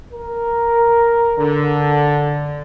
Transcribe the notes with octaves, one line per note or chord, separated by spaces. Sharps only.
A#4
D3